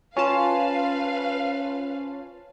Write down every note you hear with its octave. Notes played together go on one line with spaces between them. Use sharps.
C#4 F4 B4 C5 F5 A5